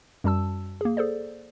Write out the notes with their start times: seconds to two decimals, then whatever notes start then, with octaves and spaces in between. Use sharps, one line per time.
0.24 F#2 G3 F#4 A5 E6
0.81 A#3 G#4
0.97 G#4 A4 C5 D5